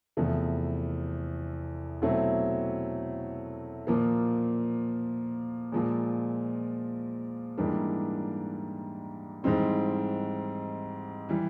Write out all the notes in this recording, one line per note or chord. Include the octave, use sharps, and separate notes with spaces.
E2 C3 F3 A3
B2 F#3 A3 C4 E4
A#2 F3 A#3
A#2 F3 G#3
G#2 E3 G3 A#3 D4
G#2 E3 G3 C4 D#4
E3 G3